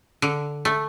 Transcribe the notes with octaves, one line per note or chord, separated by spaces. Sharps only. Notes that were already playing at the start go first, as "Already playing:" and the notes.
D3
A3